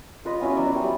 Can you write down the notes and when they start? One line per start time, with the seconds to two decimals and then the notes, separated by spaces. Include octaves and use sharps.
0.25 F4 B4 D#5
0.40 B3 C#4 E4 F#4
0.57 F#3 D5 E5
0.75 G3 B4